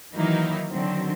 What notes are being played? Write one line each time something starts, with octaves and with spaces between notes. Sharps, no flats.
D#3 E3 F#3 A#3 D#4 E4
D3 D#3 F#3 C4